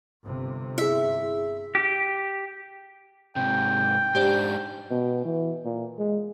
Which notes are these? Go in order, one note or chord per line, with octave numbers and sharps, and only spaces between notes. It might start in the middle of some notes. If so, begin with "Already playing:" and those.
G1 C3
E4 G#4 E5
G4
G#2 C3 G5
G#2 D4 G4 C5 D5
B2
E3
A#2
G#3